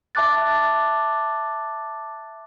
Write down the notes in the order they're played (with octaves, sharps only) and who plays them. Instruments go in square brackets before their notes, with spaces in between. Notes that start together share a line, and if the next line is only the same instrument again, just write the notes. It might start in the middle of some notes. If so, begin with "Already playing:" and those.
[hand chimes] E5 A5 D6 F#6 A6